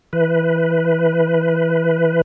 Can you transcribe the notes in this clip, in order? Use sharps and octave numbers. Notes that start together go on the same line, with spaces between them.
E3 B4